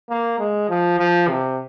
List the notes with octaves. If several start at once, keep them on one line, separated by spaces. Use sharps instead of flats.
A#3
G#3
F3
F3
C3